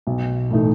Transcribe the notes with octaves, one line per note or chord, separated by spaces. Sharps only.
B1
A2 E3 A3 D#4